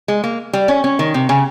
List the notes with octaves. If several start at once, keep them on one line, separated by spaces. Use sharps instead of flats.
G#3
A#3
G3
C#4
C#4
D#3
C3
C#3